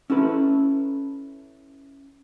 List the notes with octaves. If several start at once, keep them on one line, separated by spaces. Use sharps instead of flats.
C#4 E4 A4 B4